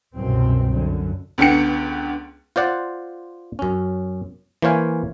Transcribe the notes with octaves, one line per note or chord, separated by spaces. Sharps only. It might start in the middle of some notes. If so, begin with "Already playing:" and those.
C2 F#2 B2 C4
F#2 D3
C#2 D3 B3 G5 C#7
F4 C5 D5 F#5
F#2 C#4
E3 A#3 C5 C#5 F5 G#5